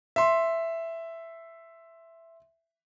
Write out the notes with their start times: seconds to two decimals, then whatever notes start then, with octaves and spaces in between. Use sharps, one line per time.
0.16 E5 C6